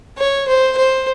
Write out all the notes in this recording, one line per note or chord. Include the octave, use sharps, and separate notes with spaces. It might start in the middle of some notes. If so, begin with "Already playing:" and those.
C#5
C5
C5